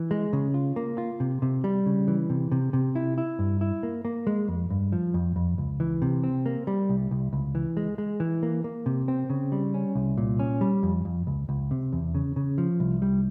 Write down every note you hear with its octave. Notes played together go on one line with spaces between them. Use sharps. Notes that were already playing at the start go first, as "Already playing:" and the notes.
Already playing: E3
G#3
C#3
F4
A#3
F4
C3
C3
G3
C#3
E3
C3
C3
C3
E4
E4
G2
E4
A#3
A#3
G#3
F2
G2
F3
F2
F2
C#2
E3
C3
C4
A#3
G3
C2
C2
C#2
E3
G#3
G#3
E3
A#3
A#3
C3
C4
C#3
G3
C#4
C2
A#2
C#4
G3
F2
F2
C#2
C#2
C3
E2
C#3
C#3
F3
C2
G3